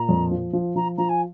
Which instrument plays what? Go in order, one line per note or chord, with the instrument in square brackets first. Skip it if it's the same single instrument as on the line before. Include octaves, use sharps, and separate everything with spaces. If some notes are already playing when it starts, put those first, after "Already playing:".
Already playing: [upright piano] A#2 [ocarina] A#5
[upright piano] F2
F3
F3
[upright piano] F3 [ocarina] A#5
[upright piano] F3 [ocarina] A#5
[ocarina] G#5